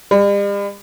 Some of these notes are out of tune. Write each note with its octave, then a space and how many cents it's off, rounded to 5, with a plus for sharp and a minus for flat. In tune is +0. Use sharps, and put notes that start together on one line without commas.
G3 +45